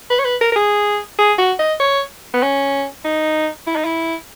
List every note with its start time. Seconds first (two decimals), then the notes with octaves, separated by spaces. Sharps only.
0.10 B4
0.19 C#5
0.25 B4
0.41 A#4
0.52 A#4
0.56 G#4
1.18 G#4
1.38 F#4
1.59 D#5
1.80 C#5
2.34 B3
2.43 C#4
3.05 D#4
3.67 E4
3.76 D#4
3.85 E4